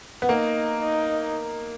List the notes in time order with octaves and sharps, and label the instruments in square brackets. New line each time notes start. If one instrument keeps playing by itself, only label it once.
[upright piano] B3
[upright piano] A#3 [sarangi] D#4
[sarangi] D#4